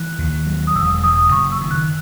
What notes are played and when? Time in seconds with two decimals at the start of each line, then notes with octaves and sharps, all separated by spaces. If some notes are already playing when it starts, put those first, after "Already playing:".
Already playing: E3 F#6
0.19 D#2
0.46 F#3
0.67 D#6
0.75 E1 E6
1.04 E1 D#6
1.32 F#1 C#6
1.52 E6
1.61 D#3
1.71 F#6